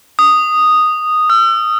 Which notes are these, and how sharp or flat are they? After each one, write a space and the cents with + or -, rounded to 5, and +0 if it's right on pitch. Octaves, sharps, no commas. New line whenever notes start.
D#6 -5
E6 +45